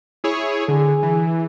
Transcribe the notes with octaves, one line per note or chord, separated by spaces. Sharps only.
E4 G#4 C#5
D3 G#4
E3